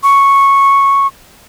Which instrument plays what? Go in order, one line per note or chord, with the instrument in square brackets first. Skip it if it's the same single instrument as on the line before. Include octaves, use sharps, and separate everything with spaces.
[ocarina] C#6